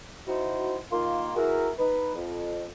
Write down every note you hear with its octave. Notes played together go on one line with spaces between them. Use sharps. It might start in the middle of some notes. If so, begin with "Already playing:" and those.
D#4 E4 F#4 C5
D#3 A#3 F4 C6
E3 E4 F#4 G#4 A#4
D#4 B4
F2